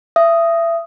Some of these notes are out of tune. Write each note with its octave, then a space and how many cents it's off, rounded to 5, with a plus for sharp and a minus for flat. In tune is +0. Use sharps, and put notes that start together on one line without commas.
E5 +25 D#6 +0